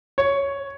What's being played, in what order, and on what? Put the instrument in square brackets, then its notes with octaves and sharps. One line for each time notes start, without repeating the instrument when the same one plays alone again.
[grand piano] C#5